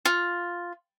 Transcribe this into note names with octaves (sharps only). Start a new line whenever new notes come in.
F4